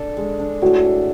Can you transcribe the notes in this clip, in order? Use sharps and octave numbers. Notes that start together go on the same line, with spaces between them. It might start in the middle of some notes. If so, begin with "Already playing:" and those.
Already playing: D4 A4
G#3
D4
A2 F#4
A4